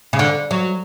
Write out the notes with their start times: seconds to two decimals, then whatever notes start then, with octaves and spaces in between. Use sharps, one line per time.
0.13 C#3
0.19 D3
0.51 F#3